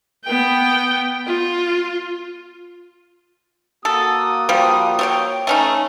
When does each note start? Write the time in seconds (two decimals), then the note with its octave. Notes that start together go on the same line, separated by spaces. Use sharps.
0.25 B3 G5
1.26 F4
3.85 A#3 F#4 A4 D#6
4.49 F3 G3
4.99 A3 C#5 G5
5.47 A3 C#4 D#4